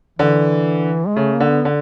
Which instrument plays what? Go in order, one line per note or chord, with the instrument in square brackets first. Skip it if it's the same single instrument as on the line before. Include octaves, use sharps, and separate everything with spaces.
[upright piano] D3 [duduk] E3
[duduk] G#3
[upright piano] C#3 [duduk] A3
[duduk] A#3
[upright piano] D3
[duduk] B3
[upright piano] D3